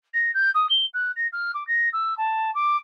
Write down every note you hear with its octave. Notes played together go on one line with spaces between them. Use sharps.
A#6
G6
D#6
G7
F#6
A#6
F6
D6
A#6
E6
A5
D6